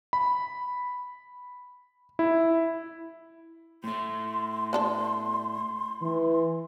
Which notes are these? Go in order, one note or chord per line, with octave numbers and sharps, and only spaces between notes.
B5
E4
A2 A3 C6
B3 D4 A4
E3